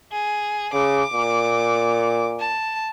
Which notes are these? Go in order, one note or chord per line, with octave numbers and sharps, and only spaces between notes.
G#4
C#3 D6
A#2
A5